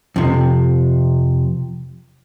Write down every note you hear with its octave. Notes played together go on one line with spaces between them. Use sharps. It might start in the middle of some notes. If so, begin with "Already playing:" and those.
F2 C3